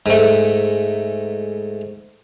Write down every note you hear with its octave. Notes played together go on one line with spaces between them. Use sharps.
G#2 A3